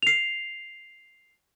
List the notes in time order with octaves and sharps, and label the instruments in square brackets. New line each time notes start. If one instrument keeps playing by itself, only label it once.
[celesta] C7 F7